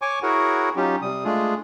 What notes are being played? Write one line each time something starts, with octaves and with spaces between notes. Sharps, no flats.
C#5 G#5 C#6 D6
E4 F#4 G#4 A#4 C#5 F#5
F#3 C#4 D#4 F4 G4
C3 G3 D#6
G#3 A3 D4 F4 G#4